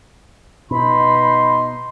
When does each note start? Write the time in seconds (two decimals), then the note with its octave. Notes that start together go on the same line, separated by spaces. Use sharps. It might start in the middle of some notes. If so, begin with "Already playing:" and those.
0.71 B2 D#4 B5 C6